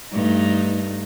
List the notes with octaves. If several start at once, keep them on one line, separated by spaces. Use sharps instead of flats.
G2 A3 D#4